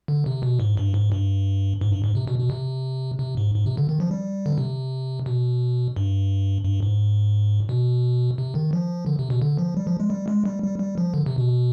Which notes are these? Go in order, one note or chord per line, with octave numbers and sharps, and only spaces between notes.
D3
C3
B2
G#2
G2
G#2
G2
G#2
G2
G#2
C3
B2
B2
C3
C3
G#2
G#2
C3
D3
D#3
F3
G3
D3
C3
B2
G2
G2
G#2
B2
C3
D#3
F3
D3
C3
B2
D3
F3
G3
F3
G#3
G3
G#3
G3
G3
G3
F3
D3
C3
B2